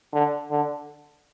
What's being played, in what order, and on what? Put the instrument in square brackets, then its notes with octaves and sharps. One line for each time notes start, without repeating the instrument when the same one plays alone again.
[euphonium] D3
D3